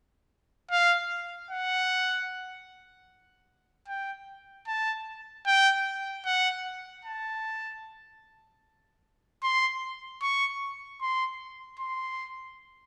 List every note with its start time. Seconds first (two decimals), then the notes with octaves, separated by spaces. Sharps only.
0.71 F5
1.51 F#5
3.88 G5
4.67 A5
5.46 G5
6.25 F#5
7.05 A5
9.43 C6
10.22 C#6
11.01 C6
11.80 C6